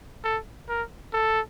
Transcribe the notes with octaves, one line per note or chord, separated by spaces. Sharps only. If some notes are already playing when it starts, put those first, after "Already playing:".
A4
A#4
A4